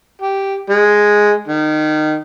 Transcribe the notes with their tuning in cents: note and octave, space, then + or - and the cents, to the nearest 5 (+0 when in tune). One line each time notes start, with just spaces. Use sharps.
G4 -5
G#3 +0
D#3 -20